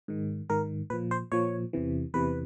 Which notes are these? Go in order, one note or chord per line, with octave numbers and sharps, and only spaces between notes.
G#2 D#3
G#2 D#3 A#4
A#2 F3 B4
C5
A#2 F3 C#5
E2 C3 E3
E2 C3 E3 B4